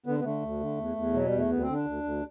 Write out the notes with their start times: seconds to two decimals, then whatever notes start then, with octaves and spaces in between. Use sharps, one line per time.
0.06 D3 B3
0.20 B3
0.24 D3 A3
0.43 D2
0.60 D3
0.78 E2
0.96 E2
1.13 B2 F#3
1.26 G3
1.31 E2
1.38 A3
1.50 D2 B3
1.61 C4
1.68 D3
1.74 D4
1.85 D2
2.03 D2